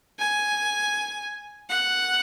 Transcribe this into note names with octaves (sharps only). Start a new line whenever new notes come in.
G#5
F#5